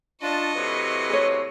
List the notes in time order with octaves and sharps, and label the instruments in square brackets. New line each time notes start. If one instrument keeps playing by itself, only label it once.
[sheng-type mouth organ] D4 F4 A5 [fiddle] D#5 C#6
[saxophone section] A2 C3 F#3 [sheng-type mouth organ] B4
[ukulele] G#4 C#5